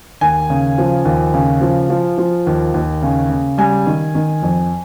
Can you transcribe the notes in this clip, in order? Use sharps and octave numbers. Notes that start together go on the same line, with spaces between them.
D#2 G#5
C#3
F3
D#2
C#3
F3
F3
F3
D#2
D#2
C#3
C#3
G3 G#5
D#3
D#3
F2